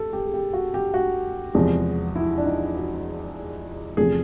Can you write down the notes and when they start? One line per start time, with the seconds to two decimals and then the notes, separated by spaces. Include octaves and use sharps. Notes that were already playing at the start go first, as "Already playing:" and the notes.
Already playing: G4 A4
0.13 G4
0.26 G#4
0.34 G4
0.53 F#4
0.74 G4
0.94 F#4
1.55 E2 C3 F3 G#3
2.16 E4
2.38 D4
2.46 D#4
2.76 F#4
3.97 E2 C3 F3 A3 G#4